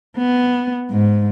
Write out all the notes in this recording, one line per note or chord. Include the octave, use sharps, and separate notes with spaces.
B3
G#2